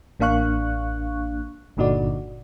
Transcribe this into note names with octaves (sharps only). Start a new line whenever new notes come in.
A1 A#3 D4 F5 C#6 F#6
G1 A#2 D3 D#4 F#4 D5